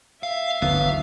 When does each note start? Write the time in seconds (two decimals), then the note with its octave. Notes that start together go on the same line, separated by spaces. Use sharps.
0.23 E5 F5
0.62 G1 D2 D3 E3 F#3 B3 F5